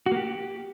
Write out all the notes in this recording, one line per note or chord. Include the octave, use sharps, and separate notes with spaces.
F#4
A#3
G4